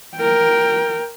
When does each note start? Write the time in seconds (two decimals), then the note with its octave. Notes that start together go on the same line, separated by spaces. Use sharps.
0.17 A#4 G5